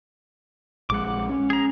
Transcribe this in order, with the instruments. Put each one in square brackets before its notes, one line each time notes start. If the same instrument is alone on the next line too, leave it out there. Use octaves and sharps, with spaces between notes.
[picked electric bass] A#1 G#3 [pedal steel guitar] F#5 D6
[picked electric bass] C#4
[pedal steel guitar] G#4 A#5